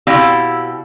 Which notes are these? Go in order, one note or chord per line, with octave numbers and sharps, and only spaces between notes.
B2 C4 E4 G4 D5 F5